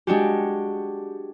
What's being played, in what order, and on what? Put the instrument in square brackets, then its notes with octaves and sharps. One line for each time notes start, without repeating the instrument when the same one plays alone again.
[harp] G#3 D4 F#4 G4